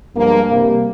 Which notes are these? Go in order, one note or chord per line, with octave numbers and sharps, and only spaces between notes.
G2 F3 G#3 A#3
C3 G3 A#3